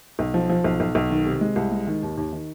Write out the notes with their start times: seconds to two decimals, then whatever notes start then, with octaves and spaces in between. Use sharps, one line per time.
0.19 B1
0.34 F3
0.49 F3
0.64 B1
0.80 B1
0.95 B1
1.11 D#3
1.26 C3
1.41 G#3
1.56 C2
1.71 G#3
1.87 D#3
2.02 D#2
2.17 D#2
2.33 D#3